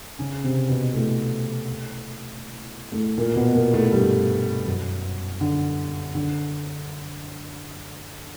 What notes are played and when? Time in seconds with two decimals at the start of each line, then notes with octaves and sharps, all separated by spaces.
0.19 C#3 C#4
0.44 C3 C4
0.69 B2 B3
0.94 A2 A3
2.92 A2 A3
3.18 A#2 A#3
3.35 B2 B3
3.55 A#2 A#3
3.73 A2 A3
3.92 G2 G3
4.66 F#2 F#3
5.41 D3
6.15 D3